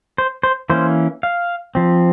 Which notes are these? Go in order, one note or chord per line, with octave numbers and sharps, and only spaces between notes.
C5
C5
E3 A#3 C#4 C5
F5
F3 C4